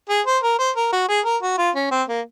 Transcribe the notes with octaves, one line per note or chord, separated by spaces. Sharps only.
G#4
C5
A#4
C5
A#4
F#4
G#4
A#4
F#4
F4
C#4
C4
A#3